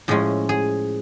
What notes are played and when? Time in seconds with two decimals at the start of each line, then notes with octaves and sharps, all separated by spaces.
0.08 A2 F3 G#3 C#4 G#4
0.49 G#4